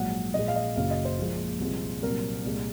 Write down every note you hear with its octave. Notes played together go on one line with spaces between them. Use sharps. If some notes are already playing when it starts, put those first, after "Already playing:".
Already playing: A#1 G#2 F#3 F#5
A#1 A#2 G#3 D#5
F5
D#5
F#1 F#2 C#3 F#3 F5
D#5
C5
A#1 A#2 F3 G#3
C2 A#2 F3 G#3
C2 A#2 F#3 A#4
C2 A#2 G#3